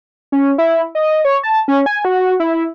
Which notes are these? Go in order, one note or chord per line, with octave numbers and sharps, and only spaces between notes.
C#4
E4
D#5
C#5
A5
C#4
G#5
F#4
E4